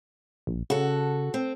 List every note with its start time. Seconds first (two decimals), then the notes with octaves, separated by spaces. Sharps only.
0.47 A#1
0.70 C#3 F#4 A4
1.34 C4